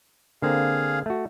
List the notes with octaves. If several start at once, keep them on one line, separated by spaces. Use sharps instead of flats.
D3 A#3 C4 G#4 F5
A3 F#4